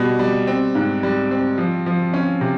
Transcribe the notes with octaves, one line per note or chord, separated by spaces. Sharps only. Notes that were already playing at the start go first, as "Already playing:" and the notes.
Already playing: B2 G3 B3
G3
C4
G#2
G3
C4
F3
F3
C#4
C3